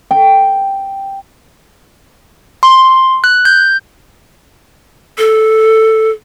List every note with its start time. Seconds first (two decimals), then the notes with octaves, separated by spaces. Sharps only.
0.11 G5
2.63 C6
3.24 F#6
3.45 G6
5.18 A4